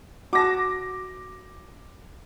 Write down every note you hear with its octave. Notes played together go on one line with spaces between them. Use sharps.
F#4 A5 D6 A#6